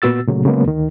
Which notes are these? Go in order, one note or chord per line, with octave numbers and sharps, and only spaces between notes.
A#2 B3 F#4 E6 A6
A#2 C#3 F#3 A3
C#3 F#3 G#3 A#3 B3
D2 D#3